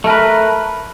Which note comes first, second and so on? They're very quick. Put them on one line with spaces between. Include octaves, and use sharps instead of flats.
A3 A#4 B4